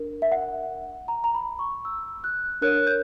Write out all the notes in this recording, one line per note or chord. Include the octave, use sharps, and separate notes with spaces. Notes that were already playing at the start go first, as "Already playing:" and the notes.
Already playing: D4 A#4
E5
F#5
A#5
A#5
B5
C#6
E6
F#6
D4 A#4 C#5 F#6
G6